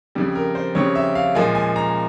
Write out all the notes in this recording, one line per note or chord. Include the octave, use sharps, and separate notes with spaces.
F2 C#3 G3
A#4
C5
F2 C#3 G3 C#5
E5
F5
A#2 F3 G#3 G#5
G#5
A#5